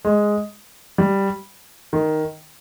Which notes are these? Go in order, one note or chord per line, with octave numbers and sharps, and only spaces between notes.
G#3
G3
D#3